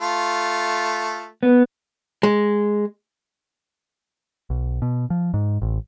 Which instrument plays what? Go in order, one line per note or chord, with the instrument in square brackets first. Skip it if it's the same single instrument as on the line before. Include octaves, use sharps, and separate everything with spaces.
[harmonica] A3 F4
[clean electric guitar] B3
[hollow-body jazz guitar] G#3
[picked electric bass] B1
B2
F3
G#2
A1